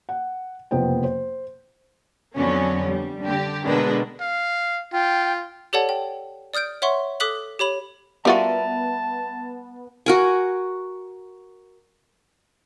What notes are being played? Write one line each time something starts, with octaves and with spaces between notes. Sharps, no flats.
F#5
F#1 F2 C3 B3 C5 G5
C5
F2 D3 F#3 B3 C#4
G3
D3 G4
B2 D3 G#3 D4 A#4 B4
F5
F4 G5
G4 A4 C#5 D5 F#5 A5
G5
D5 D#6 F6 G6 D7
C#5 E5 F#5 C6 C#6
A4 D6 D#6 F#6 B6 F#7
G4 C#5 B5 F7
G3 B3 F4 F#4 A#4 E5 A5 D#7
F#4 A#4 G#5